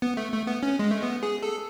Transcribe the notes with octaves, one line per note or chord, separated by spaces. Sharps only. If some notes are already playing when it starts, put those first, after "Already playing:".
B3
A3
A3
B3
C#4
G#3
A3
B3
G#4
A4